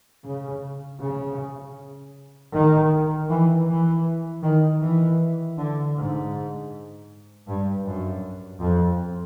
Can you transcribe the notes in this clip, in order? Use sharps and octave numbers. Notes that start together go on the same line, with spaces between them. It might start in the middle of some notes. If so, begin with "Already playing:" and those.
C#3
C#3
D#3
E3
E3
D#3
E3
D3
G#2
G2
F#2
F2